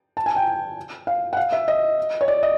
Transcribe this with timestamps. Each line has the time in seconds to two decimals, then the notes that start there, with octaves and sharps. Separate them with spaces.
0.17 A5
0.26 G#5
0.36 G5
1.07 F5
1.33 F#5
1.37 F5
1.52 E5
1.68 D#5
2.21 C#5
2.28 D5
2.43 D#5